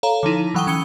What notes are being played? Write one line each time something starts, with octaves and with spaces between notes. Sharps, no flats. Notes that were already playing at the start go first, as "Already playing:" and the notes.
A4 C#5 F5 A#5
D3 F3 D#4 E4
E3 F#3 F#5 G5 D#6 G7
E3 C#4 D#6 E6 C#7 G7